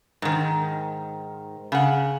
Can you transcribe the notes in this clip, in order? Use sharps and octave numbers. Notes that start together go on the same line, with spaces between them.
G#2 D#3
C#3 F#5